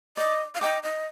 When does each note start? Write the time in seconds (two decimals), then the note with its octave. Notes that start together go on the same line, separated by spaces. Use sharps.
0.17 D5 D#5
0.55 F5
0.61 D#5 G5 D6
0.83 D#5